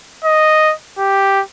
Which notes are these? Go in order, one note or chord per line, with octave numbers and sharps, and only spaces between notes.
D#5
G4